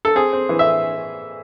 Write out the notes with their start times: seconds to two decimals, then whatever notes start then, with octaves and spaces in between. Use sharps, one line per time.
0.05 A4
0.15 C4 G#4
0.33 C4
0.49 E3
0.59 E5